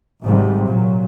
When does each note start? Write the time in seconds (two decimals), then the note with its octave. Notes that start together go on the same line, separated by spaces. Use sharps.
0.22 G#1 G#2 C3 G3
0.66 A#2 F#3